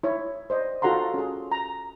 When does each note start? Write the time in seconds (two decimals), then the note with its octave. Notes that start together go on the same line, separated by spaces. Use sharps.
0.03 E4 C#5
0.50 C5 D5 D#5
0.82 F4 F#4 A4 F#5 A#5 C6
1.14 C#4 G#4
1.52 A#5